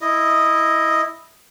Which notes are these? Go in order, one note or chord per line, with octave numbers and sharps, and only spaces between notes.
E4 D#5